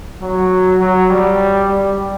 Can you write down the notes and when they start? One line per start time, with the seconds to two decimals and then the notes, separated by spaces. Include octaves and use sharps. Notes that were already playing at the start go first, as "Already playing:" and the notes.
0.22 F#3
0.80 F#3
1.10 G3
1.68 G3